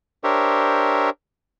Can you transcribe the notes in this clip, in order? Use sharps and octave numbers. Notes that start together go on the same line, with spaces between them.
D4 G4 A#4 C5 C#5 E5